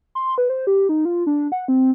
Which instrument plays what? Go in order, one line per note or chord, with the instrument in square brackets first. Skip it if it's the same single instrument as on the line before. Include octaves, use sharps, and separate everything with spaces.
[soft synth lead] C6
B4
C5
G4
D#4
F4
D4
F#5
C4